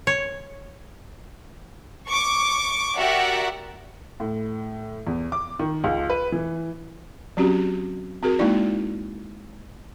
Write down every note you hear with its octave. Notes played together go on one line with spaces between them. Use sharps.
C#5
C#6 D6
F#4 G4 A#4 D5 E5 F#5
A2
E2
D6
D#3
C#2
B4
E3
F#3 C4 C#4 F#4 G4
C4 F#4 G#4 A#4
G#3 A#3 D#4 E4 D5